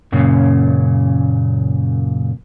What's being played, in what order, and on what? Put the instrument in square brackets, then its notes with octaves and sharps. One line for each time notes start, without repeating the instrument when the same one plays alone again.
[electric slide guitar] F#2 A#2 C#3